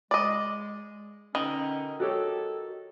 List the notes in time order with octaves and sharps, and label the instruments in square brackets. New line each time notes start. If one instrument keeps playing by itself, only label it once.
[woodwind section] G#3 [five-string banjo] D5 D#5
[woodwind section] B2 D3 C#4 [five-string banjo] D#3 [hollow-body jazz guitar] D#5
[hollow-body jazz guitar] F#4 G4 C#5 [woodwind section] A4